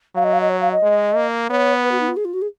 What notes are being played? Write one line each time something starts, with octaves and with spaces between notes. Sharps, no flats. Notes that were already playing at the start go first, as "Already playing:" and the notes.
F#3 F5
D#5
F5
D#5
C#5
F5
D#5
G#3
A#3
B3 C#5
B4
F#4
D#4
F4
G#4
F4
F#4
G#4